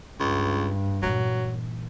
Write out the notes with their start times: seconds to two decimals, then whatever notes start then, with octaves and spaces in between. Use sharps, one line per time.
0.20 C#2 G2
1.02 A#2 E3 F#3